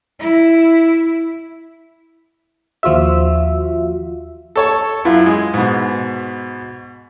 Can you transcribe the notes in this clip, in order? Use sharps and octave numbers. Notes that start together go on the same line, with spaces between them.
E4
D#2 F3 F4 F#4 E5
A4 C#5 A5
F#2 E4 F4
G#3
G#2 B2